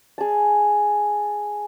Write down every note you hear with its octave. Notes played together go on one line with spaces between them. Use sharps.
G#4 A5